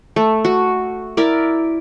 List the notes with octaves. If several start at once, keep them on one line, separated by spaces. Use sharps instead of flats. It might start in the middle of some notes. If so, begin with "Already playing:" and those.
A3
F#4
E4 A#4 D5